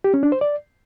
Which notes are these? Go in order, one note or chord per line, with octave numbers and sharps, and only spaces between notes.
G4
C#4
D4
C5
D5